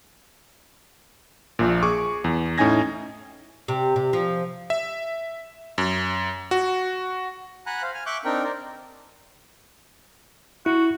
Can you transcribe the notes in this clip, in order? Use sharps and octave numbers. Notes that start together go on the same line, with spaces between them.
A#1 A#2
G#4 C#6 D6
E2
A2 C#4 D#4 G#5 G#6 A#6
C3
C3
F3
E5
F#2
F#4
F#5 G#5 A#5 B5 F#6
C5 F5
G#5 F6
E5 C#6 D6 F#6 G6
C4 D4 D#4 A#4 G5
A#4 C5 D5
E4 F#4